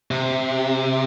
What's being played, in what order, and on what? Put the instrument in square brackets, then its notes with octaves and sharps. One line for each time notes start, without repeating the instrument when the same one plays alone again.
[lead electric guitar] C3